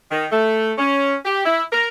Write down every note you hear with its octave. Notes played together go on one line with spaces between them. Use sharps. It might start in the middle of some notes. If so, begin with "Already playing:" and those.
D#3
A3
C#4
G4
E4
A#4